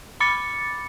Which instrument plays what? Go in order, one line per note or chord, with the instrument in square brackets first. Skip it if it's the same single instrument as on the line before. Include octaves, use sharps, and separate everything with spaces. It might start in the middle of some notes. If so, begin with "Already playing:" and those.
[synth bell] B5 D6 A6 C#7